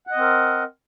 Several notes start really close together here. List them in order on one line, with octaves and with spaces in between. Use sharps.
F#5 D#5 C4 A#4